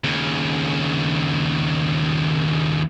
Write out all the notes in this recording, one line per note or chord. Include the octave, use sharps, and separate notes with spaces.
D#2 C#3